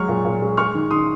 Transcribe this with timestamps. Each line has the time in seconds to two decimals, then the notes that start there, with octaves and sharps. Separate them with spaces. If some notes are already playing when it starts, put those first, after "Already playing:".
Already playing: F#3 G#3 C#6 F6
0.09 A#2
0.25 A#2
0.42 G#3
0.57 G#3 C#6 F6
0.75 D#3
0.91 D#3 C6 D#6